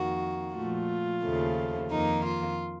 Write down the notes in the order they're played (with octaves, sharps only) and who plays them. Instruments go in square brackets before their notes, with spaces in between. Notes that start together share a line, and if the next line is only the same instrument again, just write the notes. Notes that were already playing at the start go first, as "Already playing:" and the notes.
Already playing: [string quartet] F2 D#3 A#3 F#4
A#2 F3 A3 F4
D#2 C#3 F3 A3
F2 D#3 A#3 D#4
F4